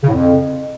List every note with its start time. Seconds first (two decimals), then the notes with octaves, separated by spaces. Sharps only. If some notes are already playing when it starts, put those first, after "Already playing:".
0.03 C#3
0.08 A2
0.13 F2